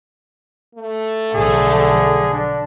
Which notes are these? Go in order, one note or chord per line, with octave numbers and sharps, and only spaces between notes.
A3
B1 D3 F3 G#4
G#4
D4